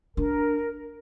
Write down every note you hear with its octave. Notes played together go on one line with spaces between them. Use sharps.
D4 A#4